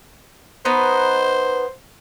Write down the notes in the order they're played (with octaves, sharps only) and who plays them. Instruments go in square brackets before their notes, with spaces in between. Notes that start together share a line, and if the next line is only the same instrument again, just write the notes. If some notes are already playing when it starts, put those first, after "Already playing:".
[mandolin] B3 D#4 B4 [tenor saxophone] C5